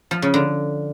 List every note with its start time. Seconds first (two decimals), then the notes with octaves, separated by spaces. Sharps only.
0.11 F3
0.22 C#3
0.34 D3